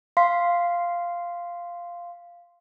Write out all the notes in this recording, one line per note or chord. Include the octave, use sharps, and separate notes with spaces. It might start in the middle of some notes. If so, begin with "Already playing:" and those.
F5 C6 B6